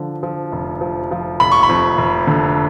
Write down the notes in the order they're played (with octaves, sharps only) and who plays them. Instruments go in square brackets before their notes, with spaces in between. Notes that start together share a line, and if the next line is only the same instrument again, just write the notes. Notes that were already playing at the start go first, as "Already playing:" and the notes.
Already playing: [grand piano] D3 F3
F3
F1
F3
F3
F1 B5
C#6
B5
F2
F1
D3